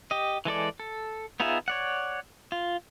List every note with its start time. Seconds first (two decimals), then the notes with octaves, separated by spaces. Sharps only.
0.11 G4 D#5
0.45 E3 G#3 A4 D5
0.80 A4
1.40 B3 D#4 F4 G#4 E5
1.68 C#5 D5 F#5
2.52 F4